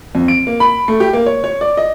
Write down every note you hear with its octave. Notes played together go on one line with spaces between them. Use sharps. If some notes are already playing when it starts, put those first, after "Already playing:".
F2
D7
A#3
B5
A3
G4
A#3
C#5
C#5
D5
D#5